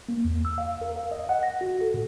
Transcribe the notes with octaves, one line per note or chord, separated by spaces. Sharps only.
A#3
E2
E6
F5
A#4
F5
D#5
F#5
A#6
F#4
A4
A#2